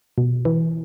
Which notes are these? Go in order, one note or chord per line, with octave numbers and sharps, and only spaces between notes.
B2
E3